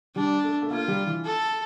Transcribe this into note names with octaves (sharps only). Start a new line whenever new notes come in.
G3 D4
A3
A3
A#3 F4
G3
E3
A4